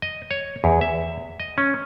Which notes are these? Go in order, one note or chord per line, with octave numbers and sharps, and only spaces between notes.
D#5
C#5
E2
E5
D#5
C#4